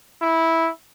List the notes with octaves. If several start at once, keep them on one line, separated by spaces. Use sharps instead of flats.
E4